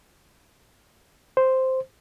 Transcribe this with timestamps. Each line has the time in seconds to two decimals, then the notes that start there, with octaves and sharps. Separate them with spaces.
1.37 C5